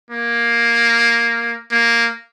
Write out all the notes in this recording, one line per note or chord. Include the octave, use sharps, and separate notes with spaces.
A#3
A#3